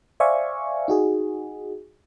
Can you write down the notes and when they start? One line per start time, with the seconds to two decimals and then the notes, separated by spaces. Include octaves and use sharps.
0.20 C5 D5 E5 F5 G#5 C#6
0.88 D#4 F#4 G#4